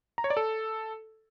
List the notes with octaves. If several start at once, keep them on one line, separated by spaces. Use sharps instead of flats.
A#5
C#5
D5
A4